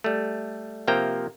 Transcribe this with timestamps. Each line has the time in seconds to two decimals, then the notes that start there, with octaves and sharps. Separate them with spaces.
0.04 G3 A3
0.87 C3 F3 A#3 E5 G5 A#5